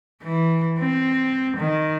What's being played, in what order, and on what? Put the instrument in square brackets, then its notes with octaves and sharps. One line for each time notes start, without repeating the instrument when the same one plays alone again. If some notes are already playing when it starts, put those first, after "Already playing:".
[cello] E3
C4
D#3